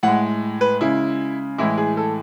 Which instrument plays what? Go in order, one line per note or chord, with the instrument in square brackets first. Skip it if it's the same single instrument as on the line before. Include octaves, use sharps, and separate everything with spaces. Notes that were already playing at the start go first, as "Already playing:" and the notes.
[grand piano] A2 G#3 F#5
B4
C#3 G#3 E4
A2 E3 G#3 E4
G#4
A4